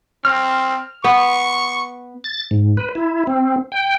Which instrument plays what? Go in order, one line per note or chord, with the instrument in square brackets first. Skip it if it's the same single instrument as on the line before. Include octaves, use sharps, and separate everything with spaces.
[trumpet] C4 [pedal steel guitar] F6
[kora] B3 [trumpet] C#6
[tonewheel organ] A6
G#2
B4
E4
C4
G5